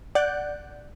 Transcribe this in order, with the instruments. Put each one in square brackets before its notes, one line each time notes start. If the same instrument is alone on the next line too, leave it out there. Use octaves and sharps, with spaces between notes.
[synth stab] D5 F#5 F#6 G6